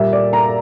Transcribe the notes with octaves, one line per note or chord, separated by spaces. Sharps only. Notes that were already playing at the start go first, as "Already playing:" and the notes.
Already playing: A#2 G3 A#3 E5
D5
A#5